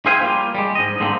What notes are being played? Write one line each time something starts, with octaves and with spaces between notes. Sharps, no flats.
G#4 C5 E5 F5 G5 G#5
G3 A#3 F4
G3 G#3
G#2 D#5
G#2 D3 D#3 A#3 C4 D#4